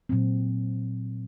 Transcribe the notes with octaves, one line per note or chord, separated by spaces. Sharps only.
A#2 F#3 C4